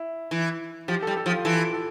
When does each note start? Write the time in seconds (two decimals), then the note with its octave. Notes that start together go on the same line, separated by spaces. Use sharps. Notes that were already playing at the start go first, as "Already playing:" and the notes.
Already playing: E4
0.31 E3
0.88 F3 G4
1.02 G3 A4
1.17 A4
1.26 F3
1.31 F4
1.45 E3 A4
1.73 A4